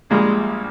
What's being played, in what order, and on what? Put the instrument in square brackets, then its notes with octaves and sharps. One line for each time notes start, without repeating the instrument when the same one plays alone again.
[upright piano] A#1 A#2 G3 A#3 [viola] G#3